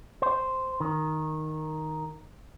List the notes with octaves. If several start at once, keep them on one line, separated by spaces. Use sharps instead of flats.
C5
D#3